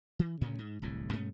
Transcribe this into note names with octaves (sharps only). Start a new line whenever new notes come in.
E3
D2 A2 C#3 C#4
G#2
D1 C2 A2
G2 B2 A3 C#4